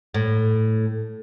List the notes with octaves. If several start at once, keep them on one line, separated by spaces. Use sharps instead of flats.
A2